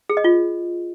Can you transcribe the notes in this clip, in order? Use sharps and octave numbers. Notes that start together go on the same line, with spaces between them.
G#4
D#5
F4